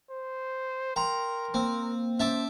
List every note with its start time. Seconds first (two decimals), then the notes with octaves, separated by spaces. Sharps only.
0.10 C5
0.96 A#4 G5 A#5 C6
1.54 A#3 C4
2.20 C#4 C5 E5 A5 D6